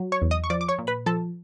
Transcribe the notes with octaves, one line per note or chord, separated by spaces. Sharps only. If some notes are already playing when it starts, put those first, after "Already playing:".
Already playing: F#3
C#5 C#6
E2
D#5 D#6
C#6
F3 D5 D6
D6
C#5 C#6
A#2
B4 B5
F3 A4 A5